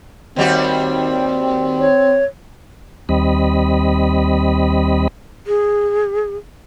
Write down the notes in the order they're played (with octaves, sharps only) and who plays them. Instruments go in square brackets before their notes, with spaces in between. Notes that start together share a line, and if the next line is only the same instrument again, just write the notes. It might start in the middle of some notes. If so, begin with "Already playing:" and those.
[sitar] D#2 G3 F#4 [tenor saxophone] C4
[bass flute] C#5
[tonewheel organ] D#2 G3 C4 D#5 B5
[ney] G#4